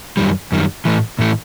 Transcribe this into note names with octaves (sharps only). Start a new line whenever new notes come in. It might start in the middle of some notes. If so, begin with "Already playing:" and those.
F#2 D#3 G3
F#2 D#3 G3
A2 E3 A3
A2 E3 A3